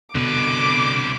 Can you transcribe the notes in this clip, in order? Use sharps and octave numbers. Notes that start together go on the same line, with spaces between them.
C2 B2 D3 B4 D6